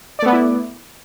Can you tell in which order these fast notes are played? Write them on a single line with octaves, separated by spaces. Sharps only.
D5 A3 B3 B4 E4